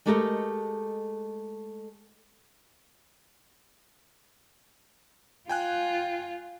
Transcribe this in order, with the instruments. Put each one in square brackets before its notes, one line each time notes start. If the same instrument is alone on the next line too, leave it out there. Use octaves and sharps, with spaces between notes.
[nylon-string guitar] G#3 A3 G4 A4 A#4 D#5
[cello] F4 [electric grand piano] G5 G#5 F#6